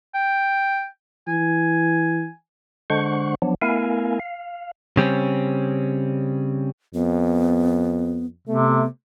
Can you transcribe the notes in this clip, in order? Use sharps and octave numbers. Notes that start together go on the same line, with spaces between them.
G5
E3 G#5
D3 G#3 D4 C5 F#5 C#6
F3 F#3 B3 D4
A3 B3 E4 A#4 F5 G#5
F5
C#3 G3 C4 C#4
F2 B3
C3 A3 B3